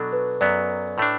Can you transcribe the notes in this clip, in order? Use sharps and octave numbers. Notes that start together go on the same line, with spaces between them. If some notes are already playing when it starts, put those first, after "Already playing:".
Already playing: B2 F#3 D4 A4
B4
F#2 F#3 B3 D5
A2 A3 D4